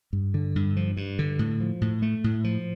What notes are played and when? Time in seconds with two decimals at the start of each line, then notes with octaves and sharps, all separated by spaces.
0.13 G2
0.34 D3
0.56 G2
0.76 F3
0.97 G2
1.19 D3
1.39 A2
1.60 F3
1.81 A2
2.02 A3
2.24 A2
2.44 F3